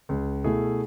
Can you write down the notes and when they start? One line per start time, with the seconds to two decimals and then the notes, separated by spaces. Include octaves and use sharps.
0.09 C#2
0.44 B2 A3 E4 G#4